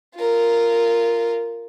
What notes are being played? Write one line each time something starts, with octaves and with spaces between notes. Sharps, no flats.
F4 A#4